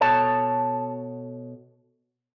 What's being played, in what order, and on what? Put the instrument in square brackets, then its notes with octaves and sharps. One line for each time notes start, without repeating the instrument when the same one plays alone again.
[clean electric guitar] B2 A4 C#5 A5